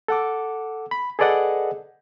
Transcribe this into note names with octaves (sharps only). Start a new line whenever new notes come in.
A4 F#5 D6
B5
G#4 A4 B4 D5 D#5 F#5